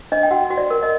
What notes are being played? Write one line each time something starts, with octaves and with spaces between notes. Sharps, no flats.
D4 D#5
G5
F#4 F#5
F#4
D5
A#4
D#5